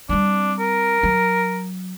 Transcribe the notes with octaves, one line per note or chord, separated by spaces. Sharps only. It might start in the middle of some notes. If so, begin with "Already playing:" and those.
G3 C4 D4
A#4
F#3